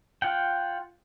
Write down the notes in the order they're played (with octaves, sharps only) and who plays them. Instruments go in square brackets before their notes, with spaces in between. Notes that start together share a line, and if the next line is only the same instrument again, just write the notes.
[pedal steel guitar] F4 F#5 G5